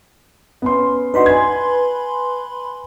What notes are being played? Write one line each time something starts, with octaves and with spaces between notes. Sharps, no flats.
B3 C#4 C6
D4 D#4 F#4 B4 B5 C6
G#5 G#6